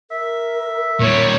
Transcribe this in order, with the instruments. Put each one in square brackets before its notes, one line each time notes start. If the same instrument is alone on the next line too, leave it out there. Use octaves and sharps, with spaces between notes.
[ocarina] A#4 [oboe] E5
[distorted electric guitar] A#2 G3 [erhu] C#5